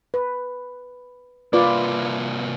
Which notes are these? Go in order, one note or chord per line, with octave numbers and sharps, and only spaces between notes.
B4
C2 A#3 F4 B4 D5